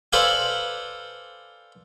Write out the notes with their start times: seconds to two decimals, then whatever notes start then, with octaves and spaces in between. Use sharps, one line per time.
0.13 A4 B4 C5 D5 F5 G#5